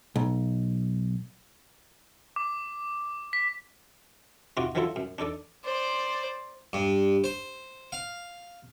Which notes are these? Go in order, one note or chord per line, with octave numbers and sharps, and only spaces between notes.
B1
D6
B6
C3 D#4 F4 F#4 D6
D#3 F3 F#3 E4 F4 A4
F#2
D4 D#4 A4 D5
C5 D5
G2
C5
F5